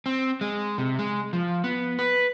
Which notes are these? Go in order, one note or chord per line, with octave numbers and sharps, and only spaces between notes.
C4
G#3
C3
G#3
F3
B3
B4